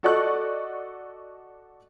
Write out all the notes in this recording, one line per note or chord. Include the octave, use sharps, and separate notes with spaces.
F#4 A4 D5 D#5 C#6 F#6